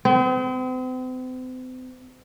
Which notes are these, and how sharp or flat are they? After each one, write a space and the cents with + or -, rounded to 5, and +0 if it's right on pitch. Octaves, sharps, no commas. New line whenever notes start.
C4 -40